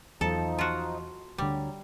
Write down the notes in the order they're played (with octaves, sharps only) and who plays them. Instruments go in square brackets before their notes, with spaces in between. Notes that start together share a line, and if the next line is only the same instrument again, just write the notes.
[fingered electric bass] E2 F#3 [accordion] F3 D#4 [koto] A4
[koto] F4 F#4
[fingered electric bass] D2 D3 [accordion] F#3 [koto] G3